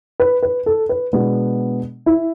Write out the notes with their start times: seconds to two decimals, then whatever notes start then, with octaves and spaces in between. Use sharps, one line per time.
0.20 B4
0.43 B4
0.66 A4
0.89 B4
1.13 B2 G#3 B3 D4
2.06 E4